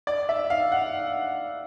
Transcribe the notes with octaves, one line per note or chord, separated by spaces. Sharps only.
D5
E5
F5
F#5